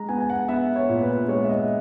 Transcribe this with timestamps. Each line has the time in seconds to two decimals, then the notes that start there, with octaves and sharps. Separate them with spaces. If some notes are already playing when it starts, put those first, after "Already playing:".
Already playing: G#3 A#5
0.09 B3 G#5
0.20 G#5
0.30 F#5
0.48 B3 E5
0.76 C#5
0.89 A#2
1.03 B4
1.28 G#3 C#5
1.44 E5
1.49 D#5